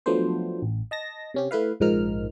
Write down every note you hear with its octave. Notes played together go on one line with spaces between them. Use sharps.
F3 F#3 A3 B3 D4 C5
A1
D#5 A5 A#6
C3 C#4 G4
A3 E4 B4 F5
A#1 G#2 F3 D#4 A#4 F6